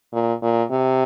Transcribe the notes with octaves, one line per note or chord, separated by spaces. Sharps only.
A#2
A#2
C3